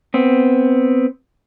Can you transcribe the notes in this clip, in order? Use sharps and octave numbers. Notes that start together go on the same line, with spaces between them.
B3 C4